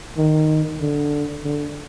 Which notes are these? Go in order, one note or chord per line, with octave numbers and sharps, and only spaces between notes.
D#3
D3
D3